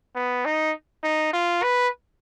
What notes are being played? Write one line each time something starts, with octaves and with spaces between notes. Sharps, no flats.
B3
D#4
D#4
F4
B4